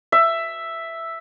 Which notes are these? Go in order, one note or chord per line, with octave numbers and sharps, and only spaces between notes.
E5